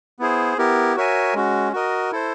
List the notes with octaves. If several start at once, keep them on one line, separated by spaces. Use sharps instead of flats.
B3 E4 G#4 C5
B3 E4 G4 A#4
F#4 A#4 C#5 E5 G#5
G#3 C#4 F#4
F#4 A#4 D#5
E4 A4 C5